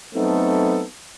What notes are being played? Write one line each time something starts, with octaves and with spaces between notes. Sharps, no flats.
F#3 A3 B3 C4 D#4 A4